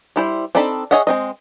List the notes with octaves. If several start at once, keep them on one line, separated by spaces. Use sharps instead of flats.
G3 E4 C5
C4 D4 D#4 A4 B5
G#4 C#5 D#5 E5 F#5
G#3 C4 D#5